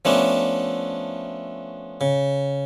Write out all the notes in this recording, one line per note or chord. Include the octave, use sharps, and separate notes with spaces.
F3 A3 B3 C#4 D4
C#3